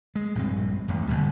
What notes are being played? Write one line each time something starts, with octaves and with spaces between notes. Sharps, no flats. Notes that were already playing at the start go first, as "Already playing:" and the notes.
G#3
A#1 G2 C4
A1 D#2
G#1 C#2 D3 G3